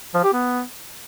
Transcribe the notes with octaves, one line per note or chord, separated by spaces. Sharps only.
F3
G4
B3